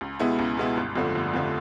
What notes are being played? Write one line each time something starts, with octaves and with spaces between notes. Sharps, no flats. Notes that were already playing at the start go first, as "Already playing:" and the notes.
C#2
B2 G#3 B3 E4
C#2
B2 G#3 B3 E4
G1
F2 D3 F3 A3
G1
F2 D3 F3 A3